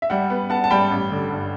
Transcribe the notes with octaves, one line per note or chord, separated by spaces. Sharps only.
E5
G3 F#5
B3
B3 F#5 A5
A5
G3 G5 B5
A1
D3
G2